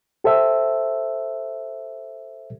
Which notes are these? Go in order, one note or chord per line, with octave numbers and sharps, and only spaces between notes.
G4 A4 C5 E5